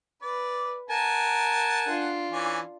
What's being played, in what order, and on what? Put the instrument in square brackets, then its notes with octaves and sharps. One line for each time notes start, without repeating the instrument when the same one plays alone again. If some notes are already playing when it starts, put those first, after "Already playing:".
[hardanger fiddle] B4 [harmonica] D5
[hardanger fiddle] A#4 [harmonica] F#5 G#5 A5
[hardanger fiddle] D4 F4
[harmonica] E3 C#4 D5